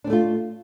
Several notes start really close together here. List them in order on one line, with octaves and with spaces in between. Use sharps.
D4 C4 A3 F4